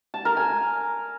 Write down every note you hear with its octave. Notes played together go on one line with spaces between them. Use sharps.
A5
A#4
G#5